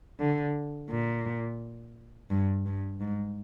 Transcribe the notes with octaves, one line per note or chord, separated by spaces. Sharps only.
D3
A#2
G2
G2
G#2